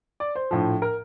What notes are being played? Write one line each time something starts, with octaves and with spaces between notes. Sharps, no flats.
D5
C5
A#1 A2 F3
A#4